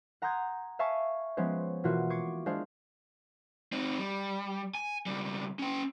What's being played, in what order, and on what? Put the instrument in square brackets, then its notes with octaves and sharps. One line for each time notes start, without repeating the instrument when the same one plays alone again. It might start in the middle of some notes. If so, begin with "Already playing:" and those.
[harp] F#5 A#5 C6 D#6 G6 G#6
E5 F5 G#5 A5 C#6 A6
F3 G#3 B3 C#4 C5
B2 E3 A#3 F4 F#4
C#6 D6 G#6 C7 C#7
G#3 D4 C5 F5
[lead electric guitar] C4 D#4
G3
G#5
C#2 G3
C#4 G5